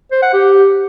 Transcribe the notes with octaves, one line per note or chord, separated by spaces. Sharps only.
C5
F#5
G4